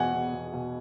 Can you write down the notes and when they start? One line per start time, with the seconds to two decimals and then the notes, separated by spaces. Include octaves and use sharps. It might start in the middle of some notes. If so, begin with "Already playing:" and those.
Already playing: E2 B2 G#3 F#5 G#5
0.14 E2
0.33 E2
0.53 B2